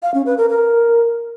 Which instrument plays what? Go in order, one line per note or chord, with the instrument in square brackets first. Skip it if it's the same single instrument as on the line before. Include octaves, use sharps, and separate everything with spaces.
[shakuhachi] F5
C#4
B4
A#4
A#4